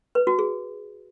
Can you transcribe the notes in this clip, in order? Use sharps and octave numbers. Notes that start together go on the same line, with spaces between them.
B4
F#4
G#4